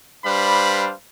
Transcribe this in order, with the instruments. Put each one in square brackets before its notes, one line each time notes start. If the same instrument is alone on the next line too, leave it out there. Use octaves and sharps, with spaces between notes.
[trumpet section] G3 D4 B4 C5 F5 B5